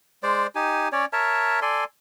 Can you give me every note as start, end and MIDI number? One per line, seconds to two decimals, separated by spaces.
0.23 0.47 56
0.23 0.47 72
0.23 0.47 74
0.55 0.88 63
0.55 0.88 67
0.55 0.88 80
0.92 1.05 61
0.92 1.05 73
0.92 1.05 74
1.13 1.60 70
1.13 1.60 73
1.13 1.60 76
1.13 1.60 81
1.62 1.84 69
1.62 1.84 74
1.62 1.84 80
1.62 1.84 84